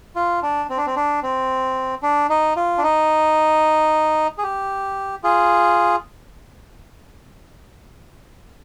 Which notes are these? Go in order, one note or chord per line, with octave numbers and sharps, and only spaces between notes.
F4
D4
C4
D4
C4
D4
C4
D4
D#4
F4
D4
D#4
G#4
G4
F4 G#4